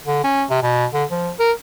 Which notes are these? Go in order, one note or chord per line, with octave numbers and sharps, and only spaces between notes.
D3
C#4
C3
B2
D3
F3
A#4